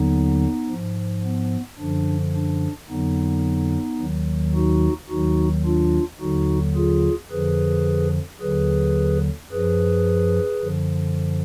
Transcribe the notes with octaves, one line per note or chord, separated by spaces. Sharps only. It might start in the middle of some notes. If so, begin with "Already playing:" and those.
Already playing: D#2 D3 F#3 B3 D#4
G#2 F3
B3
F#2 D3 F3 D4
D4
F2 D3 F#3 B3 D#4
D#2 D#3 F#3
D#4 F#4
D#2 D#3 F#3 D#4 F#4
D4 F4
D#2 D3 F#3 D#4 F#4
F4 G#4
F2 D3 F3 G#4 B4
D#2 D3 F#3 G#4 B4
F#2 F3 G#4 B4
F#2 D3 F3